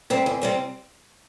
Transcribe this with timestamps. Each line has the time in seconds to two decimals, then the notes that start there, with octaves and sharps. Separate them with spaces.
0.10 C3 G3 C4
0.26 E2
0.41 C3 G3 C4